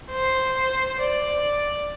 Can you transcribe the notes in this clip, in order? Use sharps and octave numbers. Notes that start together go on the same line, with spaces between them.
C5
D5